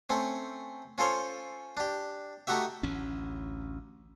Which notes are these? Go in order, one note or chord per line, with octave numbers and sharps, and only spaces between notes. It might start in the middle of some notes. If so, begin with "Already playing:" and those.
A3 C4 C#4
C#4 F4 A4 C5 C#5
D4 G4
A3 D#4 F#4 G4 E5
A1 D2 C#4